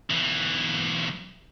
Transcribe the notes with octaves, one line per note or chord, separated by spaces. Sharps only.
B1 E3